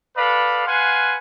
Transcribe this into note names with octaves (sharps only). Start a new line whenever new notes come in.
A4 B4 D5 F5 B5
B4 F5 F#5 G#5 C6